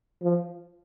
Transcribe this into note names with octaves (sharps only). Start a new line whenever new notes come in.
F3